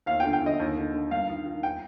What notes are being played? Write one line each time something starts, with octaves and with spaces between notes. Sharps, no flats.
D#2 F5
G5
D3
G5
D3 D#5
D#2
D3
D3
G2 F5
D#3
D#3
G5